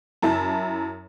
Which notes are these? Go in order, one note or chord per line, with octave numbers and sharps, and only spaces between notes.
F#2 E4 A5